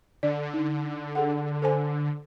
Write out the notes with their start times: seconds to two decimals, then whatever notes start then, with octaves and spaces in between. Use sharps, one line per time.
0.23 D3 D5
0.54 D#4
1.15 G#4 A4 F#5
1.62 A4 C5 G#5